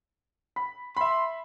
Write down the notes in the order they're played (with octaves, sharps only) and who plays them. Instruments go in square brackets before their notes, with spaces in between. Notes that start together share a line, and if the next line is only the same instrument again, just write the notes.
[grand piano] B5
[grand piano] E5 B5 [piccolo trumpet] C6